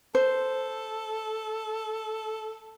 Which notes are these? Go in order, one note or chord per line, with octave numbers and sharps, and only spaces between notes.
A4 C5